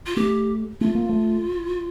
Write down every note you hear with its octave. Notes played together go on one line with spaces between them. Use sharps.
F4
A3 G4
A3 F4
A#3
A3